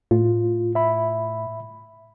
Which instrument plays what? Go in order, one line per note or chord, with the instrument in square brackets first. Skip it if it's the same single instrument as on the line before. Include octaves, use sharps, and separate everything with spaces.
[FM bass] A2 [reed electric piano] F4
[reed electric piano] E5 B5